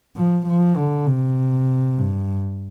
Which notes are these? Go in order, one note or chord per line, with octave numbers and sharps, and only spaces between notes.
F3
F3
D3
C3
G2